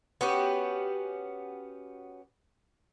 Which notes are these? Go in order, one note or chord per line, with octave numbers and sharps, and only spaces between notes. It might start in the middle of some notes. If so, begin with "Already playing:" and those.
B3 C#4 F#4 G4